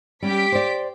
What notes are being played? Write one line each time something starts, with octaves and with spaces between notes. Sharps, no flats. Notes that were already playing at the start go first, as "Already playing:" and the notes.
G3 C#4 G4 B6 D7
C5 D5